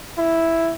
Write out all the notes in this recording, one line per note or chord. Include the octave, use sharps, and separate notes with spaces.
E4